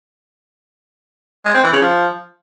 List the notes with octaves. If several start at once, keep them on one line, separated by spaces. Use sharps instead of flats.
G#3
C4
E3
C#3
F3